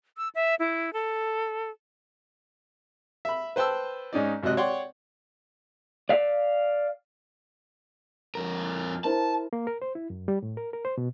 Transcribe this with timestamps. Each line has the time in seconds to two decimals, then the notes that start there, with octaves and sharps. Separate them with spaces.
0.17 E6
0.35 E5
0.59 E4
0.93 A4
3.25 E5 B5
3.56 B4 C5 G5 A5 E6
4.13 G#2 C#4 D#4 D5
4.43 G#1 C3 F#3 D#5 F#6
4.57 C#5 D5 F#5 G5 C6
6.09 D5 F5
8.35 F2 A#4
9.04 E4 A#4 C5 A5
9.53 A#3
9.67 A#4
9.82 C5
9.95 E4
10.10 F#2
10.28 G3
10.43 A2
10.57 A#4
10.73 A#4
10.85 C5
10.98 B2